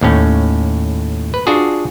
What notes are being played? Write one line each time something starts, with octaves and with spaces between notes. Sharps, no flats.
D#2 A2 C#4
B4
D4 F4 F#4 G#4